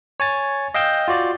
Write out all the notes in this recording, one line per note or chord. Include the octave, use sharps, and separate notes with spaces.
C#5 G#5 A6
D#5 F5 G5 E6 G6
F4 F#4 D5